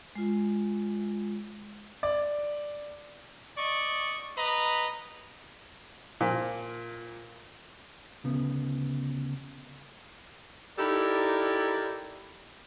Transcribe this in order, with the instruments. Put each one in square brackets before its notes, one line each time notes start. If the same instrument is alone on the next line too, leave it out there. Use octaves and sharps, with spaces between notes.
[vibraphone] G#3 F4
[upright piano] D5
[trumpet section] D5 D#5 C#6
B4 D#5 A#5
[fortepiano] A#2 F3
[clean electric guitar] D2 C#3 B3
[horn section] D#4 E4 G4 A4 A#4 D5